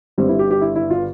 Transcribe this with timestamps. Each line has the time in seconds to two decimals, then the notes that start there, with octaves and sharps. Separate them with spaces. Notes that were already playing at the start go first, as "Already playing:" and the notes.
0.18 G1 G2 D3 G3 C4
0.28 E4
0.39 G4
0.51 G4
0.61 E4
0.76 E4
0.91 F4